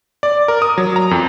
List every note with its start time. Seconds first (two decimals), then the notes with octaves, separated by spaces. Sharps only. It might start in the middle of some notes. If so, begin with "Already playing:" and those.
0.23 D5
0.48 A#4
0.62 D#6
0.78 F#3
0.96 A#5
1.11 F2